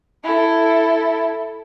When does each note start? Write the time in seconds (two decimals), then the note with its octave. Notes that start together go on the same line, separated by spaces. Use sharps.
0.23 E4 A4